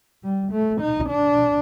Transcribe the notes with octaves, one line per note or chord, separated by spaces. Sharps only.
G3
A3
D#4
D4